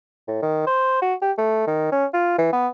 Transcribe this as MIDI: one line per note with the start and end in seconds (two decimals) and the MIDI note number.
0.28 0.41 45
0.42 0.65 51
0.67 1.01 72
1.02 1.14 66
1.22 1.31 67
1.38 1.62 57
1.67 1.87 51
1.92 2.05 61
2.13 2.38 65
2.38 2.48 52
2.53 2.68 59